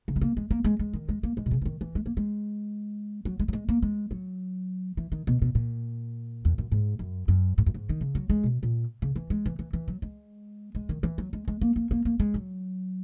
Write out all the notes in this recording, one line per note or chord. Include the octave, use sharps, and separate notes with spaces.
C#3
G#3
A#3
G#3
A#3
G#3
G#3
D#3
G#3
A#3
G#3
B2
C#3
E3
D#3
E3
G#3
A#3
G#3
F#3
G#3
F#3
G#3
A#3
G#3
F#3
E3
D#3
B2
B2
A#2
E2
F#2
G#2
F#2
F#2
G#2
F#2
G#2
D#3
C#3
F#3
G#3
B2
A#2
C#3
E3
G#3
E3
E3
E3
F#3
G#3
G#3
D#3
E3
F#3
G#3
G#3
A#3
A#3
A#3
A#3
G#3
F#3